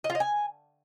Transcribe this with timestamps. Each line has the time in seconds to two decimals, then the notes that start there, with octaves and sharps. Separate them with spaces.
0.04 D#5
0.10 F4
0.15 D#5
0.20 G#5